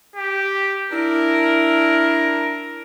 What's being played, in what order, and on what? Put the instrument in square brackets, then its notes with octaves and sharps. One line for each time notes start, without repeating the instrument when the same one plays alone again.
[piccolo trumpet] G4
[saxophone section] D4 E4 [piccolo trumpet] A#4